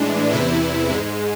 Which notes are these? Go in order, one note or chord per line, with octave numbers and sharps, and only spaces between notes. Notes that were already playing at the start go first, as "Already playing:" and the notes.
Already playing: A2 E3 G#3 D4
E2 C3 E3 E4
G#2 G#3